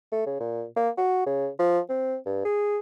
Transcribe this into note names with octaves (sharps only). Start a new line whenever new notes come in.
A3
C#3
A#2
A#3
F#4
C#3
F3
C4
G2
G#4